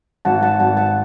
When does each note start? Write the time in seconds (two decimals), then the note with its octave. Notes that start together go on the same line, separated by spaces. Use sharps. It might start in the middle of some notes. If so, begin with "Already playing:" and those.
0.25 G#1 F#5 A5
0.43 F#5 A5
0.60 G#1 F#5 A5
0.77 F#5 A5